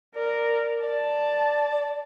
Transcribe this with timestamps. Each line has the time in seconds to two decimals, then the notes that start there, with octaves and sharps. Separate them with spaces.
0.16 A#4 D5
0.84 D5 A5